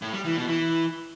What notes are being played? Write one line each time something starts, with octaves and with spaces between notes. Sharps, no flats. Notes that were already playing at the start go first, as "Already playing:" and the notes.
A2
G3
E3
B2
E3